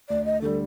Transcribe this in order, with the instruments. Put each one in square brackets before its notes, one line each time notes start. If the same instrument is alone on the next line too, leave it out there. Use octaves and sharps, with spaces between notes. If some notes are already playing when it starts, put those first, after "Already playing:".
[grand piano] D2 [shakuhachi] D5
[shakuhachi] D#5
[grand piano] D3 G3 [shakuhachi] A4